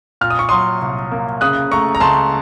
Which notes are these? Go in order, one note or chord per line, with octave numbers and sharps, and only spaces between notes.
A#2 F6
D#6
C#6
F#3 C6 D#6
C2
A#3
C#3 D#6 F#6
A3 A#5 C#6
A#5
C#2 A5 C6